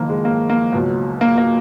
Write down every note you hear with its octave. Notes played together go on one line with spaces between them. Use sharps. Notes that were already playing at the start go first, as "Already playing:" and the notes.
Already playing: F#1 F2 D#3 A#3
G#3
A#3
A#3
C#2 B2 F#3
A#3
A#3